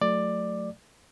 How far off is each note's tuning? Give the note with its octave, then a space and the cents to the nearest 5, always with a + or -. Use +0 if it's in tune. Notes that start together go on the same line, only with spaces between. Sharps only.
F#3 -25 A3 +0 D5 +10